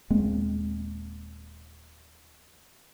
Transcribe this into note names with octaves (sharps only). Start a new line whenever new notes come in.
D#1 G#3 A#3 C4